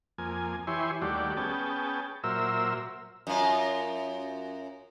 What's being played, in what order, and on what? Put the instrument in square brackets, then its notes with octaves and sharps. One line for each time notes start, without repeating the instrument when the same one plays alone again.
[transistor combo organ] F2 A#3 G#5
E3 E4 G4 C#5 G#5 C6
D#2 G3 A3 F#4 G4 D5
B3 C#4 G#4 G5 A5
A#2 F#3 A#4 C5 E5 E6
[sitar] F#2 F4